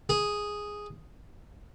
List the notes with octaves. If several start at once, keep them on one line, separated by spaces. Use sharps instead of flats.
G#4